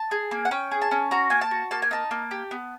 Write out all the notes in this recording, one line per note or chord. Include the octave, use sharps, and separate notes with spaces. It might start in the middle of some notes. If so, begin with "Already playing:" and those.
Already playing: A5
G#4
A#3
F#5
C#4 G5
G#4
A5
C#4
F#4 A#5
A#3 G#5
A5
F#4
A#3 A5
G#5
D#4 A5
A#3
G4
B3